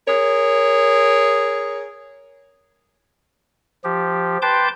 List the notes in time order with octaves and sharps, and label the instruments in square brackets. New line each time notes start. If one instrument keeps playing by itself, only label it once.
[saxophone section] G#4 A#4 C#5
[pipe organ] F3 G4
B4 G5 A5 C6 D6 G6